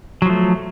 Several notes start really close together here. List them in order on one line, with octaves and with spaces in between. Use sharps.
F#3 F3 A3